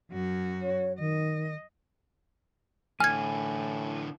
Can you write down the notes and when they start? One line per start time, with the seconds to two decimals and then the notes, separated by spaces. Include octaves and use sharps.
0.11 F#2 F#4
0.62 C#5
1.00 D#3 D#5
3.00 A2 D3 E3 G#5 F6 G#6